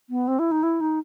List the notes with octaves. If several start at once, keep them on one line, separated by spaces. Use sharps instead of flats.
B3
C4
E4
D#4
E4
D#4